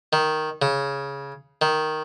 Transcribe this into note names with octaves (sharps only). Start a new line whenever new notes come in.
D#3
C#3
D#3